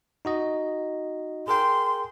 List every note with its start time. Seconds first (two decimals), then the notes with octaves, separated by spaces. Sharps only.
0.25 D#4 F#4 D#5
1.48 G#4 A#4 G5 C6